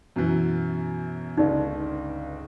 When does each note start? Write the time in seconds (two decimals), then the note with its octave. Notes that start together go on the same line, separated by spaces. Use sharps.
0.16 F#2 B2 E3
1.37 G1 C#2 D#4 D5